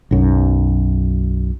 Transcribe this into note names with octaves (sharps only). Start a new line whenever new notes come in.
B1 F#2